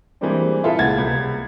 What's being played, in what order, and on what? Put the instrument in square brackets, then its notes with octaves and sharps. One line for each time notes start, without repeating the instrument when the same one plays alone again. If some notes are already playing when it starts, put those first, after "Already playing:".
[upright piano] E3 G3 G#3 A#3 C4 D4
E4 F4 G#4 A4 B4 E5
C#2 A#2 F#5 G#6 A6
C2 G#3